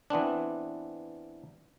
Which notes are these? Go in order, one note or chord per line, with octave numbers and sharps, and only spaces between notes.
E3 B3 C4 D4